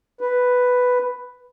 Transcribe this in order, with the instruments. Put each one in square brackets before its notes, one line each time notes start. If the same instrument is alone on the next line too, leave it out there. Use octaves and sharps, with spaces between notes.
[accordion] B4